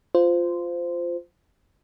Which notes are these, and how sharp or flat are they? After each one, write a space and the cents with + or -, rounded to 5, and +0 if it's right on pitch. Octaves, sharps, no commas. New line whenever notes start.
F4 +0 C5 -15